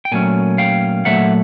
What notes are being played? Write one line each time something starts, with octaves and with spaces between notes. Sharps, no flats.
G5
A#2 F#3 A3 C#4 G#5
F5 G5
A#2 F#3 A3 E5 F#5